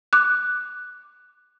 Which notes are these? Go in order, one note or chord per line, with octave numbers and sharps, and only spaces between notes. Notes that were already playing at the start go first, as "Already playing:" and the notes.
D6 F#6